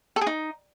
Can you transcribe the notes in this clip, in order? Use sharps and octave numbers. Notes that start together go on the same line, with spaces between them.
A4
G#4
D#4